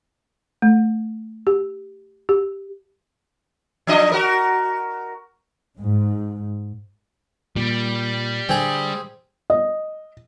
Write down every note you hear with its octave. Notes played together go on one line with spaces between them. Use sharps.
A3
G4
G4
F3 D4 D#5
F#4 A#4
G#2
A#2 G3
D3 C4 G#4
D#5